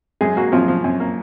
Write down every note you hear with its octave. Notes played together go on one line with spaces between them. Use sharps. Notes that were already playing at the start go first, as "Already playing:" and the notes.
F#2 G#3 G#4
F#3 A#3 F#4
F#2 F3 F4
F3
F#2
A#3